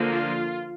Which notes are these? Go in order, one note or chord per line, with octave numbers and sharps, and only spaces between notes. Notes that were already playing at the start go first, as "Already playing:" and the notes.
Already playing: D3 F3 A#3
F4